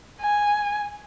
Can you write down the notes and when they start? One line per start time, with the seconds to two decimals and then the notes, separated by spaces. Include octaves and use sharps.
0.21 G#5